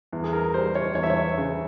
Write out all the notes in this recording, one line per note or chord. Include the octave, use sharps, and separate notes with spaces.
E2
G#4
A#4
G3 C5
C#5
E2 C#5
E5
C#5
C#3